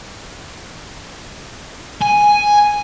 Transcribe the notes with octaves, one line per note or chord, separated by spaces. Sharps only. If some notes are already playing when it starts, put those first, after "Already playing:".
G#5